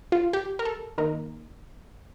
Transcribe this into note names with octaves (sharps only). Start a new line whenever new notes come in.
F4
G4
A#4
A4
D#3 A#3 D#4 A#4